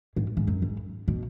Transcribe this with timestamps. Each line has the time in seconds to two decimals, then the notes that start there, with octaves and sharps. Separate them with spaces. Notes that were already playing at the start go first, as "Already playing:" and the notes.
0.16 G#2
0.37 G#2
0.48 F#2
0.62 G#2
1.08 B2